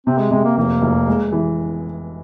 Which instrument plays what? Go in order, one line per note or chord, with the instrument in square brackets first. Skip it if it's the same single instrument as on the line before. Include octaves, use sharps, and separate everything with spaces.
[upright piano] C3 [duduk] C4
[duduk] G#3
[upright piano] C3 [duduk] G#3
[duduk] A#3
[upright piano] F1 [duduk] A#3
[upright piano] F1
G#3
E3